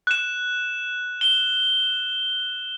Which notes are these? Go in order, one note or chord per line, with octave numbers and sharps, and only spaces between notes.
F#6 E7
G7